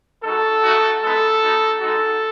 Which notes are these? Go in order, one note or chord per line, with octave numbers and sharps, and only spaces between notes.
G#3 D#4 F#4 A4
A3 D#4 F#4
G#3 B3 D#4 A4
B3 D#4 F#4
G#3 D#4 F#4 A4